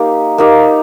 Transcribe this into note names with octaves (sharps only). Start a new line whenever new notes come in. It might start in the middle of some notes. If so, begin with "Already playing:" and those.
Already playing: A#3 D#4 G4
A#3 D#4 G4